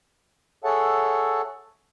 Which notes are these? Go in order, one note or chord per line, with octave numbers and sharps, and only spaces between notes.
G#4 A4 C#5 E5 F#5 A5